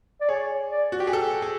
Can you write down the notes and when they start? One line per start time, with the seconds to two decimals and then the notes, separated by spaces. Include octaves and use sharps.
0.21 D5
0.29 G#4 C#5
0.71 D5
0.92 F#4
1.00 G4
1.07 G#4
1.13 A4
1.42 G#4